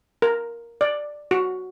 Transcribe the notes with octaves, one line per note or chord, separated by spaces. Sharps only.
A#4
D5
F#4